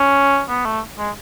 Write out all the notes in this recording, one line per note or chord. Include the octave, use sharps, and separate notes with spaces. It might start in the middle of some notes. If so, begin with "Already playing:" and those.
Already playing: C#4
B3
A3
G#3